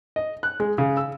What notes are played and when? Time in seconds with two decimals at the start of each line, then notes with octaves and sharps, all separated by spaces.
0.16 D#5
0.43 F#6
0.60 G#3
0.78 C#3
0.97 E6